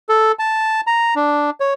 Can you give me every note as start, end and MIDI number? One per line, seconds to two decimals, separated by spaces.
0.09 0.32 69
0.39 0.81 81
0.87 1.14 82
1.16 1.50 62
1.60 1.74 73